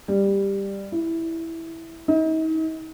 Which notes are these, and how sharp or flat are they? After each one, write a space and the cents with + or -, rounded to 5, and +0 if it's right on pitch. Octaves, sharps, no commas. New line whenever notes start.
G3 +10
E4 -5
D#4 +40